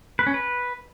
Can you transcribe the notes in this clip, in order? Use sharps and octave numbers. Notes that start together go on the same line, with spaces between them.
B4
C#4
B4